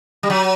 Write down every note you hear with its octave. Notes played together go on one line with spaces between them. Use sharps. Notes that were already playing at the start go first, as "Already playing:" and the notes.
G3
F#3